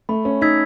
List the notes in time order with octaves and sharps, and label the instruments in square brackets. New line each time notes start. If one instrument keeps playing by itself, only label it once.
[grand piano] A3 [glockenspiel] B5
[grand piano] C#4
[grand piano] D#4 [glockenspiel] E6 G#6 B6